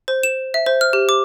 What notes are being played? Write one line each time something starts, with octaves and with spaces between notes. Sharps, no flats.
C5
E7
E5
C5
F6
G4
D6